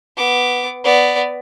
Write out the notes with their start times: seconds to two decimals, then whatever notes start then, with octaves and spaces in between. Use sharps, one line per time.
0.17 B3 D6
0.84 B3 D5